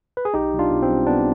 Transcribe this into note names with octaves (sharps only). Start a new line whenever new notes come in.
B4
G#4
B1 D#4 G4
B1
D4 F4
B2
C4
G3
B1 B3 D4